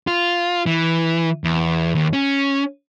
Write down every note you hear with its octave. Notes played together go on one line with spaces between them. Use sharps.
F4
E3
E2
D#2
C#4